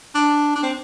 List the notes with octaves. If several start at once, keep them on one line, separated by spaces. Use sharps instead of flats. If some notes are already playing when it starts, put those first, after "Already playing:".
D4
D4
C4